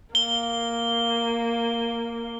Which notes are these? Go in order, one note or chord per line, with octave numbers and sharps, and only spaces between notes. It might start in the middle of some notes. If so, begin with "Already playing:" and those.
A#3 G7